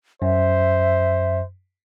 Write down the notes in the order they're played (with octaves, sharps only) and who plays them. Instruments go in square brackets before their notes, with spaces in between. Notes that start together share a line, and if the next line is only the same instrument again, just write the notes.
[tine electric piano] F#2 [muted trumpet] C5 [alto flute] E5